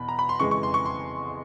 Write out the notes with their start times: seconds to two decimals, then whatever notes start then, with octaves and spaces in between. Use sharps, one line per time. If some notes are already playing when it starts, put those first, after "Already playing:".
Already playing: E2 B2 B5
0.09 A#5
0.19 B5
0.29 C6
0.40 F2 C#3 E3 G#3 C#6
0.51 C#6
0.63 C6
0.74 C#6
0.85 C6